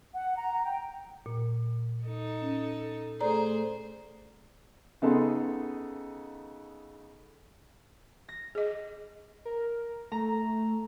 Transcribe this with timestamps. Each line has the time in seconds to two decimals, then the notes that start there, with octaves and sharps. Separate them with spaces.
0.14 F#5
0.38 A#5
0.65 G5
1.26 A#2
2.04 D#4 A4
2.42 C#4
3.21 A3 G#4 A4 C5 D5 A#5
5.02 C#3 B3 D#4 G#4 A4 C6
8.29 A#6
8.55 G#4 D#5
9.45 A#4
10.12 A3 A#5